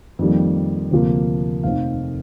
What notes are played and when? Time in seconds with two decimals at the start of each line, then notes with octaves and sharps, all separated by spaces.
0.19 F2 D#3 G3 A#3
0.91 D2 C3 F3 A#3
1.64 F1 D#2 D#3 A3 C4 F5